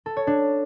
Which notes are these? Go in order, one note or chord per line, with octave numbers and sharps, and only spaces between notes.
A4
C#5
D4